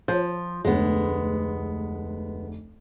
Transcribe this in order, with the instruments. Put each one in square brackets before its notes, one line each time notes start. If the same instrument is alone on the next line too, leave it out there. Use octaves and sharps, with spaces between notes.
[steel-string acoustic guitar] F3 [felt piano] G6
[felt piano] F1 D2 [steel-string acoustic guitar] G#3 B3